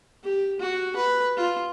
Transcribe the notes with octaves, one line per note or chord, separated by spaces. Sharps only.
G4
F#4
B4
F4